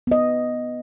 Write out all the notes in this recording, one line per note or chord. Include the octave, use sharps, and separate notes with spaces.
B3 D#5